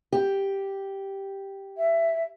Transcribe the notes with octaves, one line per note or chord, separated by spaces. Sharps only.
G4
E5